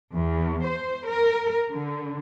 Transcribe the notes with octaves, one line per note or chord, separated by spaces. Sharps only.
E2
C5
A#4
D3